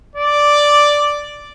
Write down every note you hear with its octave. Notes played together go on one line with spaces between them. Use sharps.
D5